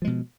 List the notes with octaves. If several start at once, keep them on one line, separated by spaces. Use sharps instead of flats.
B2 F3 G#3